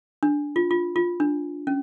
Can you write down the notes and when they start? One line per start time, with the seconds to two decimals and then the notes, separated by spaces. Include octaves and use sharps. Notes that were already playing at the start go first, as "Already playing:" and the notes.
0.23 D4
0.56 F4
0.71 F4
0.96 F4
1.20 D4
1.67 C#4